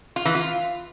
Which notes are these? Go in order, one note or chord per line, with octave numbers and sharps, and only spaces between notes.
F4
E3
F4